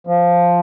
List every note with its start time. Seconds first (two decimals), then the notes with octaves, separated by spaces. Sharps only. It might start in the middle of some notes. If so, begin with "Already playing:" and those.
0.07 F3